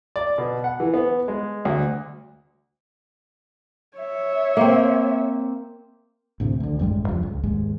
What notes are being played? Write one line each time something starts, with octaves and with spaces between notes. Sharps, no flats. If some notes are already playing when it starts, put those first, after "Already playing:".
D5
B2
F#5
E3
B3
G#3
D2
C#5 E5
A#3 C4
D2 A2 C3
D2 D3
A1 F#2 G3 G#3
E2 G2 C#3 F3
C#2
D#2 G#2 G#3